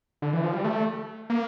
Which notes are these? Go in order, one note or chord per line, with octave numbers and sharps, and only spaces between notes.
D3
E3
F3
G3
A3
A#3